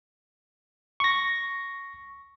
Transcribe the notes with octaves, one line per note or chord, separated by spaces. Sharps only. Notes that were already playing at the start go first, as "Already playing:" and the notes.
C#6 A#6